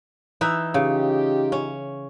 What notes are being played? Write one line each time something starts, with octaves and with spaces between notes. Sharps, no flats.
E3 D#4 E5
C#3 D#4 F4 G4
C#4